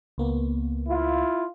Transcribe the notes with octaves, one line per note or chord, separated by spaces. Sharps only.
C#2 A#3 B3
E4 F4